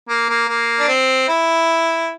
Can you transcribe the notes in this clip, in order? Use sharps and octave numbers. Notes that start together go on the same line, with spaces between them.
A#3
A#3
A#3
D4
C4
E4